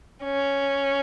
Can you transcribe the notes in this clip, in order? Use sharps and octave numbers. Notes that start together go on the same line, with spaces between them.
C#4